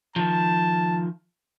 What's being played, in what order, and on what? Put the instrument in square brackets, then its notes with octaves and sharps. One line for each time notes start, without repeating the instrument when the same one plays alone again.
[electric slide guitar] D#3 F3 [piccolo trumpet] A5